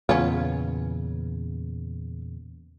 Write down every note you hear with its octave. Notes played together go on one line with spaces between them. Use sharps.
E2 A#2 C#3 B3 C#4 F4